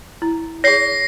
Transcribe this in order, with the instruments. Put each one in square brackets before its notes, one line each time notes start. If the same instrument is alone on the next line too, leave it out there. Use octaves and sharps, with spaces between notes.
[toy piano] E4
[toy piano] G#4 C#5 [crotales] A#6 C7